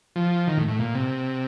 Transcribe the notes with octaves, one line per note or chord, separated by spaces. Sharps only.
F3
D#3
A2
A2
A#2
C3